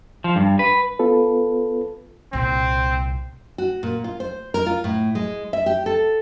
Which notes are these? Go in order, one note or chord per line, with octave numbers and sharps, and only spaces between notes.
F3
G2
B4
B3 F4 A4 B4
C2 A#2 C4
F#4
A#2
F4
C5
A#4
F4
A2
G#3
E5
G4
A4